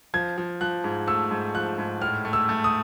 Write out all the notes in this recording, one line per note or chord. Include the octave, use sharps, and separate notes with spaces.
F3 G#6
F3
F3 F#6
G#2
A3 E6
G#2
F3 F#6
G#2
A2 F6
A3
E6
A3
D#6